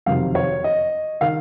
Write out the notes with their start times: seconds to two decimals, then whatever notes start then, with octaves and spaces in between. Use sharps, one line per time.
0.06 F#1 F2 C3 D#3 F#3 F5
0.35 C#5
0.64 D#5
1.21 D#3 F5